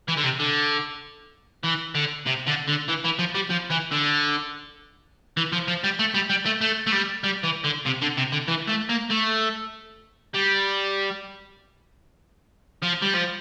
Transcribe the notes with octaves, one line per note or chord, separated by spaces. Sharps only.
E3
D3
C3
D3
E3
D3
C3
D3
D3
E3
E3
F3
G3
F3
E3
D3
E3
F3
F3
G3
A3
G3
G3
A3
A3
A3
G3
G3
E3
D3
C3
D3
C3
D3
E3
A3
A#3
A3
G3
F3
G3
F3